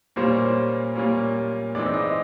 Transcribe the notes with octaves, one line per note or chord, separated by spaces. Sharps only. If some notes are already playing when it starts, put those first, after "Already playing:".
A#2 G3 A#3 C#4 C5
A#2 G3 A#3 C#4
G#2 E3 G#3 C4 D#4 D5
D#5